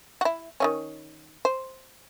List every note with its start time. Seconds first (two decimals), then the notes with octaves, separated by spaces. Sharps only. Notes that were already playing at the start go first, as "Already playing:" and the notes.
0.21 E4 F#4
0.60 D#3 E3 C#4
1.45 C5